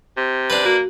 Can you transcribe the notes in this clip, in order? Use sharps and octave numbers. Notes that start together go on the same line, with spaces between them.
C3
D4 B4
A#3 F#4